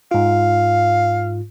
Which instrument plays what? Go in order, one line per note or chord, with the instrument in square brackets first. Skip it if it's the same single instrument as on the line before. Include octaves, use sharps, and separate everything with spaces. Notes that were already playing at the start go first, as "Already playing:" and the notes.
[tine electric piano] G#2 F4 [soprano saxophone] F5